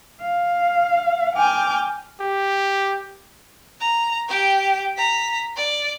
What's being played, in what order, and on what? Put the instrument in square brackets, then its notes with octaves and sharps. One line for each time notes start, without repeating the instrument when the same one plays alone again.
[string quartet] F5
G5 G#5 D6 F6 G6
[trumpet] G4
[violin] A#5
G4 G5
A#5 B6
D5